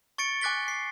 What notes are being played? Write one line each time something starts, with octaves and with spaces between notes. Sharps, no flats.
C#6 A6 C#7 D7
G#5 D6 F#6 A6 B6 G7
C7